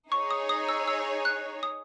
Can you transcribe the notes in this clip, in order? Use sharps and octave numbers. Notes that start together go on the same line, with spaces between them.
D#4 G#4 C#5 C#6
D#6
D#6
E6
E6
F#6
D#6